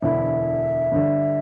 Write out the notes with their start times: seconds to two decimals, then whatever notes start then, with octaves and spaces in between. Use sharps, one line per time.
0.02 E1 D2 D3 B3 E4 E5
0.92 G1 G2 D3